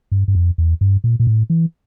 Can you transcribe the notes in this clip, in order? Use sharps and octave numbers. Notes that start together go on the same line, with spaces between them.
G2
G2
F2
E2
G2
A#2
A#2
A2
E3